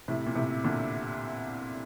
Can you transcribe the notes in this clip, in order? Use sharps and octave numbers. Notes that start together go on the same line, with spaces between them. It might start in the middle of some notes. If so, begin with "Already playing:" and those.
A2 C3
A#2
A2 C3
A#2 D3